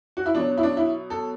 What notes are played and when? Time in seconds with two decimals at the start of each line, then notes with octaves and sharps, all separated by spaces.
0.17 F#4
0.26 E4
0.35 B2 F#3 D4
0.57 E4
0.63 D4
0.77 E4
1.10 A4